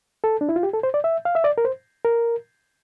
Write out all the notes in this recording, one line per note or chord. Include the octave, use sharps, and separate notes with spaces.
A4
D4
E4
F4
G4
A4
C5
D5
E5
F5
E5
D5
A#4
C5
A#4